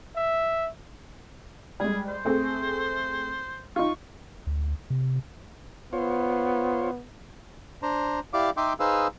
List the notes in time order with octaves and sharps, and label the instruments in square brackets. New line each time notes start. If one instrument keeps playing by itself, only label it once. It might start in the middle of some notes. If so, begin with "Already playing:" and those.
[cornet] E5
[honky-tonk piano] G3 G#3 [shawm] G#4
[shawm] C5
[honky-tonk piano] A3 C4 G#4
[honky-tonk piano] D#4 F4 [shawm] C#6
[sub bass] D2
C3
[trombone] B3 [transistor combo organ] F4 C5 C#5
[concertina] D4 C5 A#5
E4 G4 D5 F5 D6
D#4 E5 G5 C6 D6
D#4 G#4 B4 C5 F5 E6